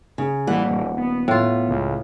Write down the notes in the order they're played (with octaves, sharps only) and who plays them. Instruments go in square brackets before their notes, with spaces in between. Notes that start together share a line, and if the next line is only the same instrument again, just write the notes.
[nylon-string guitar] C#3
[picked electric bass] A1 G3 A#3 [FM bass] E3 [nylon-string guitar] F#5
[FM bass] D#1
[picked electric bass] B3
[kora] A2 F4
[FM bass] C#2